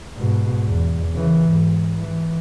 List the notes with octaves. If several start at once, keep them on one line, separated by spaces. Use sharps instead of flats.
G#2 B2
E2
C#3 E3
G#2
E3